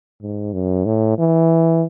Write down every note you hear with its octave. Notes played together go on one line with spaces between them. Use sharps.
G#2
F#2
A2
E3